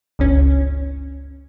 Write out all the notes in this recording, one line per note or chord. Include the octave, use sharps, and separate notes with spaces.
G1 C#2 C#4